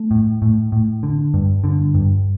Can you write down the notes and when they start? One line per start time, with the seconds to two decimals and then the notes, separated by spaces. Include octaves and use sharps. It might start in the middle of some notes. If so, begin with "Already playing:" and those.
Already playing: A3
0.11 A2
0.42 A2
0.72 A2
1.03 D3
1.34 G2
1.64 D3
1.95 G2